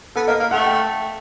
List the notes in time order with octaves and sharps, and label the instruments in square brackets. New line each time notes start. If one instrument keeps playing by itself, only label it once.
[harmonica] B3 [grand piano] A4
[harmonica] A#3 [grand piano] D#5
[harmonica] A#3 [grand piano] F5
[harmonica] A3 [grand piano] F#5
[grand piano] G5